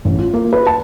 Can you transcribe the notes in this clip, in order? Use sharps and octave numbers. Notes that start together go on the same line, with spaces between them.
A1
F4
A#3
B4
A5